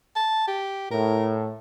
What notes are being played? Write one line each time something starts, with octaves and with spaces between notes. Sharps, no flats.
A5
G4
A2 A#4